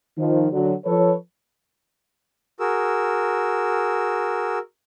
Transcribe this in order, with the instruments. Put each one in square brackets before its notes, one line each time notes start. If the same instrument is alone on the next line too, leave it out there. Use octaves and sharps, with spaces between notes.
[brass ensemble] D#3 F3
D3 F#3
F3 A4 B4 C#5
[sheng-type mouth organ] F#4 G#4 A#4 E6